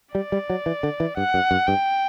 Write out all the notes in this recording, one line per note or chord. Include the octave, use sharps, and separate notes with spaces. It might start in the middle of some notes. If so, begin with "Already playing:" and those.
G3 D5
G3
F#3
E3
D3
E3
G2 F#5
F#2
F#2
G2 G5